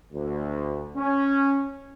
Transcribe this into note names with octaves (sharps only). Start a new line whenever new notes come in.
D2
C#4